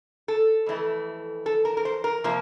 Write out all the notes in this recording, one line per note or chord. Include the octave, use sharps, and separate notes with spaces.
A4
F2 E3 A3
A4
A#4
A#4
C5
A#4
C3 F3 A#3